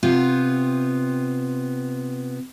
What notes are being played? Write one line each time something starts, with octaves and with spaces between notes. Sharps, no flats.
C3 B3 F4